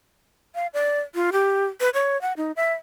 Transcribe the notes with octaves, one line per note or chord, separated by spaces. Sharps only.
F5
D5
F4
G4
B4
C#5
F#5
D#4
E5